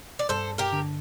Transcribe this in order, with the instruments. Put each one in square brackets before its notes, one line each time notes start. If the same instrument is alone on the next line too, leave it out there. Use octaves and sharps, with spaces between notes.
[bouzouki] D5
[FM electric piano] G2 [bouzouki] A4 C5
[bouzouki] G4 A#4
[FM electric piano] D3